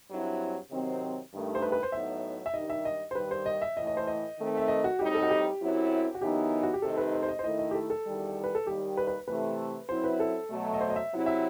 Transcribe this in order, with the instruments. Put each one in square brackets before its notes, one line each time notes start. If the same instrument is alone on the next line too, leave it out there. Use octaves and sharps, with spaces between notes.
[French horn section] G2 F#3 C4 E4
C3 D#3 F#3 C4
G2 D#3 A3
[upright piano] C5
B4
B4
C5
[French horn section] A2 F#3 B3 D#4 [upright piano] E5
[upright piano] E5
[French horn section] G2 D#3 G3 D#4 [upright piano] D#5
[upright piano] E5
D#5
C5
[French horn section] G2 D#3 G3 [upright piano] B4
[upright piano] C5
D#5
E5
[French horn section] A2 E3 A3 [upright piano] D#5
[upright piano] D#5
C5
D#5
[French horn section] D#3 A3 C4
[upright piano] E5
D#5
F#4
[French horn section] A2 G3 C4 D#4 [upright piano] G4
[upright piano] A4
F#4
G4
[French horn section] F#2 F#3 C4 E4
[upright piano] F#4
[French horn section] F#2 E3 B3 D#4 [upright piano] G4
[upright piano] F#4
G4
[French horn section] C3 D#3 A3 D#4 [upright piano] A4
[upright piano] B4
C5
C5
D#5
C5
[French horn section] D#3 A3 E4 [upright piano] D#5
[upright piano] D#5
G4
A4
A4
[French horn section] E2 D#3 G3
[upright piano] B4
A4
[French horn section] D#2 D#3 G3 [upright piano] G4
[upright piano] B4
B4
[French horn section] C3 E3 A3 [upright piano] B4
[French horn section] F#2 F#3 C4 E4 [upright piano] C5
[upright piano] B4
A4
[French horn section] B2 F#3 A3
[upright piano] D#5
C5
D#5
E5
[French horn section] C3 F#3 C4 E4
[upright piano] E5